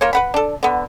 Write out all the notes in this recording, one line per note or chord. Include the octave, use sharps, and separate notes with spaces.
A#3 F4 C#5
B4 F#5 B5
D4 A4
D3 B3